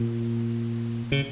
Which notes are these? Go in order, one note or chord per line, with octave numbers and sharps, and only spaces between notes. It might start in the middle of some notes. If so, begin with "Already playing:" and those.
Already playing: A#2
C#3